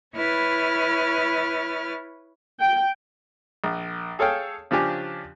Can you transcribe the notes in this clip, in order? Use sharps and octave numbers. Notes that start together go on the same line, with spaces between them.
E4 B4 C#5 F6 A6
G5
A#1
G#4 A4 C#5 F5 G5
C#3 F3 D4 G4 G#5